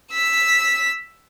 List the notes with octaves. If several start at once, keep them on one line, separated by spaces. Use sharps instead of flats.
E6 B6